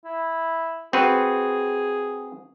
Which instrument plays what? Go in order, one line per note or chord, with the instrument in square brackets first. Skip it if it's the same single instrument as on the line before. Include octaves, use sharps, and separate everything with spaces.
[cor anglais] E4
[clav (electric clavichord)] C4 F#4 B4 [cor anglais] G#4